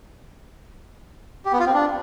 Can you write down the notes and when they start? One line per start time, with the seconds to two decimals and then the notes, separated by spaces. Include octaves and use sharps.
1.45 G4
1.52 B3
1.59 F4
1.67 C4
1.74 D4